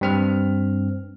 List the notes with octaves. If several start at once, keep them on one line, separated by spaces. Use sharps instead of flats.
G2 C4 F6